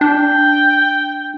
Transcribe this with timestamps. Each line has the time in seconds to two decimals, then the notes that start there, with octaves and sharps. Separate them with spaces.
0.01 D4 G5